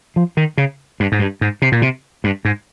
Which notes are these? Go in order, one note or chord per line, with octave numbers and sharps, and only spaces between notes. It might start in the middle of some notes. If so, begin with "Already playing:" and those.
F3
D#3
C#3
G2
G#2
G2
G#2
C3
A#2
C3
G2
G#2